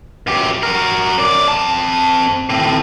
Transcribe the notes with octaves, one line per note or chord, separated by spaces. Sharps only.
F#2 G4
F#4 A#4
F#2 D5
C4 A5
A2 C4